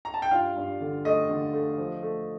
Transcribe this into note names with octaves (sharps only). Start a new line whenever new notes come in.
A#5
A5
G5
G2 F4 F5
G2
D3
A3 D#5
D3
A3
F3
A3